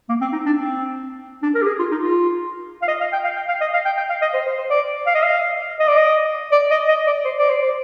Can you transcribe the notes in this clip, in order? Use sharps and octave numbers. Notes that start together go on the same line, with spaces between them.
A#3
C4
D#4
D4
C4
D4
A#4
G4
G#4
F4
D#4
F4
F5
D#5
F5
G5
F5
G5
F5
D#5
F5
G5
G5
F5
D#5
C5
C5
C5
D5
F5
D#5
F5
D#5
D5
D#5
D5
D#5
D#5
D5
C5
D5
C5
C5